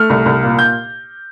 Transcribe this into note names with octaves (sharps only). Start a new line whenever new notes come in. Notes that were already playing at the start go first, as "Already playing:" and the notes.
Already playing: A3 F6
C2
C2
A#2
G6